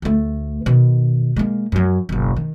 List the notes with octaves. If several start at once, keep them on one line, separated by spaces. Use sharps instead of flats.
D2 A3
B2 D#3
G#3 A#3
F#2 F#3
F#1 B1
D#3